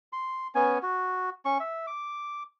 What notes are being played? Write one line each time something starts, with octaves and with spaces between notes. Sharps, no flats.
C6
B3 C#4 G#5
F#4
C#4 C#6
E5
D6